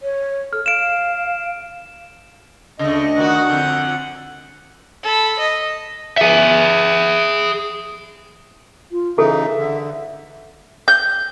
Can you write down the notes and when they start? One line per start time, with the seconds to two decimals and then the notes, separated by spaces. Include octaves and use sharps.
0.02 C#5
0.53 A4 F6
0.66 F5 D7 E7
2.79 D2 C#3 A3 D4 D#5
3.18 D#3 F#4 F#5
3.50 F2 D3 G6
5.03 A4 B5
5.39 D#5
6.18 G#4 E5
8.92 F4
9.18 C#3 E3 D#4 G#4 A4 E5
9.59 D3
10.88 G6